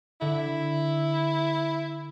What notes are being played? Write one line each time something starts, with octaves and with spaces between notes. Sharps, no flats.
D3 E4